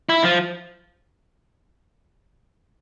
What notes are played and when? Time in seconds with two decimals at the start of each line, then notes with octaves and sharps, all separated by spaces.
0.09 E4
0.24 F3